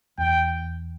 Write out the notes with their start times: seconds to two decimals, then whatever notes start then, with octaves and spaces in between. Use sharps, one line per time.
0.18 E2 G5